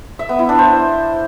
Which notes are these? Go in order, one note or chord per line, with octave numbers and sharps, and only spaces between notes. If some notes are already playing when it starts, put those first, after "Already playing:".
E5
B3
E4
D4
C5